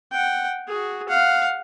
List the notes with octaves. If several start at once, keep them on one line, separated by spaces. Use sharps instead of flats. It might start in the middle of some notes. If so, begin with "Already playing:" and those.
F#5 G5
F#4 G#4
F5 F#5